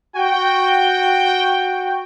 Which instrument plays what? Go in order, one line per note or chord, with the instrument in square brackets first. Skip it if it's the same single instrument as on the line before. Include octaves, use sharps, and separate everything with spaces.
[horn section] F#4 G5